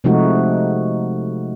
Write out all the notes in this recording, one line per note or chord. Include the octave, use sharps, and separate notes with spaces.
C3 F3 G#3 A3 D#4 F#4